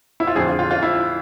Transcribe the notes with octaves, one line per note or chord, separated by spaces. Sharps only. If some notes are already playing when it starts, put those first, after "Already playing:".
E4
F4
F2 D3 F3 G#4
F4
F4
F4
E4